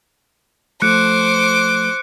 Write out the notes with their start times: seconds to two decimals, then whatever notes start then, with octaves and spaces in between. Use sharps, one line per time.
0.82 F3 A3 C5 D6 F#6 C#7